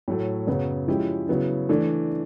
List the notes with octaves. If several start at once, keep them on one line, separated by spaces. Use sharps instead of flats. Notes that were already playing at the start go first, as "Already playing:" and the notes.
A2 F#3 A3
F#2 C#3 F#3 B3
F3 G#3 C#4 E4 G4
C#3 F#3 B3 E4
E3 A3 D4